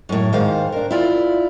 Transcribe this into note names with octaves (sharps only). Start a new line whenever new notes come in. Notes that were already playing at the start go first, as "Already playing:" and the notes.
F#2 A2
G#2 D#3 C5 F5
D4 A#4
E4 F4 D5